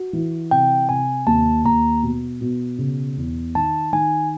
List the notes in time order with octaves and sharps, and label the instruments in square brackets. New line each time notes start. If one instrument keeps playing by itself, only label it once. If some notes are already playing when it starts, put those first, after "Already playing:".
Already playing: [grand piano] F#4
E3
[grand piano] C3 [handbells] G5
[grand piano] C3 [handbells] G#5
[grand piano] D#2 [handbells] A5
[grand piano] D#2 [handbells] A#5
[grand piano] B2
B2
C#3
E2
[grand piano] D#3 [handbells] A5
[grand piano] D#3 [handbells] G#5